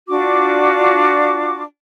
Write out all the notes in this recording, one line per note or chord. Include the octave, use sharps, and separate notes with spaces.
D4 F4 F#4 D6